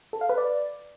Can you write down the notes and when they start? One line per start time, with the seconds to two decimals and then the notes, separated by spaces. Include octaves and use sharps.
0.13 A4
0.21 F5
0.29 B4
0.38 D5